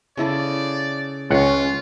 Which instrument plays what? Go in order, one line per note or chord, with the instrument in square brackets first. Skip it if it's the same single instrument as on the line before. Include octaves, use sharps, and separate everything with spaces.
[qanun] C#3 E4 A4 [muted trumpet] D5
[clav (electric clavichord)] C#2 F#5 [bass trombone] C#4 [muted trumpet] F4